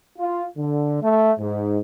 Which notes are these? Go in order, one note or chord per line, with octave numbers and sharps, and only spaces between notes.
F4
D3
A3
G#2